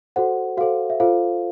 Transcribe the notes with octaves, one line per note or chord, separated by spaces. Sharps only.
F#4 A4 C5 F#5
F#4 A4 C5 F5
E5
F4 A4 C5 F5